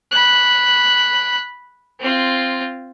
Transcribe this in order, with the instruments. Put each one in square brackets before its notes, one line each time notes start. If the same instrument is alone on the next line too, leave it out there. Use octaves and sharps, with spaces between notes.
[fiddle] B5 F#6
C4 F4